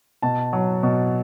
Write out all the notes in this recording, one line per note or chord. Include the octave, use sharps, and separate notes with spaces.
B2 A5
F#3
B2